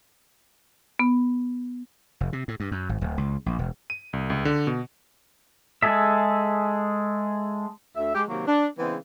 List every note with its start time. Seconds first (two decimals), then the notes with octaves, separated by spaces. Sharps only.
0.99 B3
2.20 F1
2.33 C3
2.48 A2
2.60 G2
2.71 F#2
2.89 G#1
3.01 D1
3.18 C#2
3.46 A#1
3.59 E1
3.90 D#7
4.13 C2
4.30 C#2
4.45 D3
4.67 B2
5.83 G#3 G#4 A4 E5
7.95 D2 E5
8.15 G#3 G4
8.28 C3 D#3 F#3 A#3
8.47 D4
8.78 C#3 E3 G#3 B3 C4